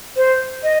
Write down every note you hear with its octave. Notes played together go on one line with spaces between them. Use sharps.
C5
D#5